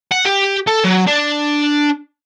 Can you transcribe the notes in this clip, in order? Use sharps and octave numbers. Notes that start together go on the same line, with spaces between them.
F#5
G4
A4
F#3
D4